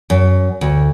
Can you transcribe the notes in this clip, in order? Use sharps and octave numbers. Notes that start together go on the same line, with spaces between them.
F#2
D2